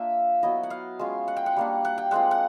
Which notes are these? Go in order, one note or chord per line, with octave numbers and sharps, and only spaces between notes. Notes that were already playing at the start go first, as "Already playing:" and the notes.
Already playing: A#3 D4 F4 E5
F#3 B3 E4 D#5
F#5
F5
G#3 C#4 F4
F#5
G5
F#5
G3 A#3 D4
F#5
G5
G#3 C4 F4 F#5
F#5